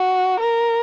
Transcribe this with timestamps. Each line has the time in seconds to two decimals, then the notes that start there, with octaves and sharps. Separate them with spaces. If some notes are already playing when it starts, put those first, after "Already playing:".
Already playing: F#4
0.40 A#4